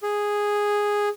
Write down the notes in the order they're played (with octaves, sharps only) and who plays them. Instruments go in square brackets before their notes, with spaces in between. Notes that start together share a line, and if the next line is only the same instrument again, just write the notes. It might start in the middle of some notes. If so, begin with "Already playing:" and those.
[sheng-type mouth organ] G#4